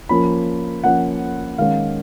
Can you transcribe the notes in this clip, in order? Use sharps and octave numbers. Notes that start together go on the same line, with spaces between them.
F3 A#3 C#4 B5
F3 A#3 C#4 F#5
D#3 G#3 C#4 F5